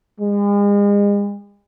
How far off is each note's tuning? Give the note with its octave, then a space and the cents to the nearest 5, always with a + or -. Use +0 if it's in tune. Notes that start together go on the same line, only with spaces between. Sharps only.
G#3 -40